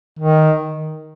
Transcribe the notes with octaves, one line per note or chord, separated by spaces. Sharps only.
D#3